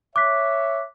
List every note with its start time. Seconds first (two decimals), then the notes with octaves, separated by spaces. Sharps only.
0.16 C#5 E5 D6 F#6 B6